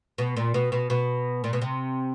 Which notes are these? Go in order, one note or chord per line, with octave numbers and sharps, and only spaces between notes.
B2
A#2
B2
B2
B2
A#2
B2
C3